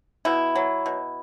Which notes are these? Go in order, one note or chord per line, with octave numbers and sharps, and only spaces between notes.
B2 E4
F#3
B2